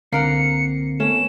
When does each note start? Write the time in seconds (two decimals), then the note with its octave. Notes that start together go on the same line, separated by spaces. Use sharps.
0.12 C2 D3 A#3 C4 A#4 F#5 C7 C#7
1.00 A3 B3 C#4 E7